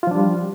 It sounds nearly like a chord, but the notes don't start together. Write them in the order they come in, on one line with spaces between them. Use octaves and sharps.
F4 F3 D4 G3